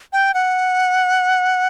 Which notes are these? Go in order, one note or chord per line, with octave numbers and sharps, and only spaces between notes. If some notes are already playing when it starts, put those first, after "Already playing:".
G5
F#5